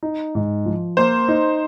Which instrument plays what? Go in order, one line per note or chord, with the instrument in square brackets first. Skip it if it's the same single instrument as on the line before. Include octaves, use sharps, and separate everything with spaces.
[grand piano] D#4
G#2
F3
[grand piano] A#3 [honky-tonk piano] C5
[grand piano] D#4